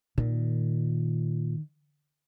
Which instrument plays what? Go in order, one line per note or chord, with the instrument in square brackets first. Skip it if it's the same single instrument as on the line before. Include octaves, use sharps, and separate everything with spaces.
[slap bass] A#2 [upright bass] D#3